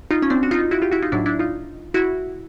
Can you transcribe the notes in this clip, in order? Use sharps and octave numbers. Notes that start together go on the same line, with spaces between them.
D#4 F4
C#4
C4 D4
F#4
D#4 F4
E4 F#4
F4 G4
E4 F#4
D#4 F4
A2 F#3 D4 E4
D4 E4
D#4 F4
E4 F#4